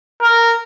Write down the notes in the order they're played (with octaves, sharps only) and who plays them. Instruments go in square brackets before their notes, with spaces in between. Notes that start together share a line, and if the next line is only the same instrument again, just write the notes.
[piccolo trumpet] A#4